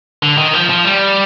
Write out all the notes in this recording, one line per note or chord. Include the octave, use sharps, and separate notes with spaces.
D3
D#3
F3
F3
G3